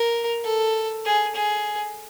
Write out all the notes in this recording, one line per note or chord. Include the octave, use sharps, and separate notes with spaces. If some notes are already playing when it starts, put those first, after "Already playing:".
Already playing: A#4
A4
G#4
G#4